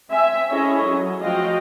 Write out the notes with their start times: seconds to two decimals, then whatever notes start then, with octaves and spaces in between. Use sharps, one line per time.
0.11 C4 E5 G#5
0.50 C#4 E4 G#4 A4 C#5 D#5
0.84 F#3
1.22 F3 A3 F#4 D#5 F5 G5